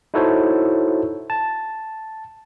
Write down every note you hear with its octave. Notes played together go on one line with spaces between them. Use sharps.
D#4 E4 F#4 A4 C5 C#5
A5